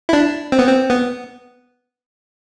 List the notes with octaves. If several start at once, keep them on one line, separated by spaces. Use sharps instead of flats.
E4
D4
C4
B3
C4
B3